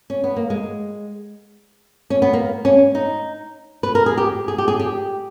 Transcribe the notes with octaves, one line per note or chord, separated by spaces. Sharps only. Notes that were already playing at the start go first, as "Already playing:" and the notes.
C#4
B3
A#3
G#3
C#4
B3
A#3
C#4
D#4
B4
A#4
G#4
G4
G#4
G4
G#4
G4